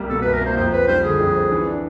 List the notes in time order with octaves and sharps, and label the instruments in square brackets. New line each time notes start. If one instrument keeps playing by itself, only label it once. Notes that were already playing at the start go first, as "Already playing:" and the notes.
Already playing: [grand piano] C2 G3 A#3
[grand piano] B2 [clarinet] A4
[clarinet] B4
[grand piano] C2
[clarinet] A#4
[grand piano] A#3 [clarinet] C5
[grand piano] F2 [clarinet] C5
[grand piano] C4 [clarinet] B4
[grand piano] G3 [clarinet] C5
[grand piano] D3 [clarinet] G#4
[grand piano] F2
C4
E3
D4